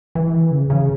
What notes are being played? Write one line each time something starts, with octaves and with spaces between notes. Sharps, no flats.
E3
C#3
C#3